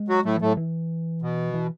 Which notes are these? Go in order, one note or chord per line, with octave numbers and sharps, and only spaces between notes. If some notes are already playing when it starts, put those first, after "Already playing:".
Already playing: G#3
F#3 F#4
A2 F#3 A3
E3
A2 F#3 A3
E3
B2
E3